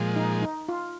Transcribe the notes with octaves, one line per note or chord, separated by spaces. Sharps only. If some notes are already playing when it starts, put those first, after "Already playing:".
Already playing: A#2 F3 G#3
D#4
D#4
F4